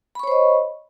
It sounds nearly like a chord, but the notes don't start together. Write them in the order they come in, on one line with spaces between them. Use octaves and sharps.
B5 C#6 C#5 C5 D#5